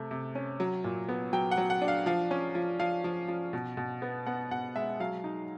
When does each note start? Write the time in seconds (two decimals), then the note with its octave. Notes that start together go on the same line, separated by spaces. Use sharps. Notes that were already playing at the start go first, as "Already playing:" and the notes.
Already playing: C3 A3
0.11 C3
0.35 C#4
0.60 F#3
0.84 A#2
1.09 B3
1.33 F#3 G5
1.51 F#5
1.57 F#3
1.70 F#5
1.82 D4
1.88 F5
2.06 F3 F5
2.31 C#4
2.55 F3
2.79 F3 F5
3.04 F3
3.28 F3
3.53 B2
3.77 B2
4.02 B3
4.27 B3 F#5
4.51 B2 F#5
4.76 G#3 E5
5.00 F#3 F5
5.24 D#4